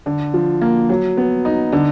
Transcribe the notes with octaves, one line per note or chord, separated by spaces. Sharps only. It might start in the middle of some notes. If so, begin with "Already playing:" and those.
D3
F3
A#3
F#3
B3
D#4
D3